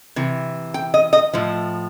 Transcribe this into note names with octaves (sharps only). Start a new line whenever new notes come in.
C3 E3
G5
D#5
D#5
A2 F3